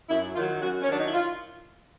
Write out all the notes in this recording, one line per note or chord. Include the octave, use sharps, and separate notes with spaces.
F#2 E4
D#3 F#3 F4
F#2 F#4
C#4
D#3 F#3 D4
D#4
E4
F4